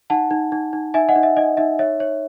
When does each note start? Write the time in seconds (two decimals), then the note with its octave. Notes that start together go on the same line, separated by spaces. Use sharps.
0.10 D#4 F#5 A5
0.31 D#4
0.52 D#4
0.73 D#4
0.94 D#4 E5 G#5
1.09 D#5 F#5
1.16 D#4
1.23 E5
1.37 D#4 D#5
1.57 D#4 E5
1.79 C#5 E5
2.00 C#5